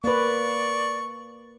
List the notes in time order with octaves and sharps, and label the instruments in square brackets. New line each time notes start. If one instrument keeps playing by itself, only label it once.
[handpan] A#3 B4 [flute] D5 [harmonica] C#6